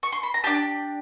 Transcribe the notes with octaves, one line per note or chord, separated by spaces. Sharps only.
C#6
C6
B5
A#5
D4 G4 A5